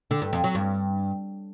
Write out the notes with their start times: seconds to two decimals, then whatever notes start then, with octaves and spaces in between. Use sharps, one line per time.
0.11 D3
0.22 G2
0.33 F2
0.44 F#3
0.55 G2